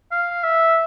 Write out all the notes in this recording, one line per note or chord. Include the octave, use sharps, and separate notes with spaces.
F5
E5